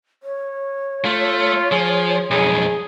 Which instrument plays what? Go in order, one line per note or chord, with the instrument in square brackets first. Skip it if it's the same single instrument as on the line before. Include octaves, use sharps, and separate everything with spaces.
[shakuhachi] C#5
[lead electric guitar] A3 [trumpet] F4
[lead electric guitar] F3 [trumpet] G#4
[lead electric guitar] B1 F2 [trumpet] G#4